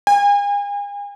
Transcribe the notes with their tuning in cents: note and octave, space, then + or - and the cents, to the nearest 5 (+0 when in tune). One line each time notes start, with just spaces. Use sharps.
G#5 -40